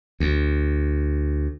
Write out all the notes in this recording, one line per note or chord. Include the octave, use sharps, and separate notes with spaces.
D2